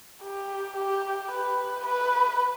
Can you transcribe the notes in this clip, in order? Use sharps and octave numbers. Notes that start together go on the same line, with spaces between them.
G4
G4
B4
B4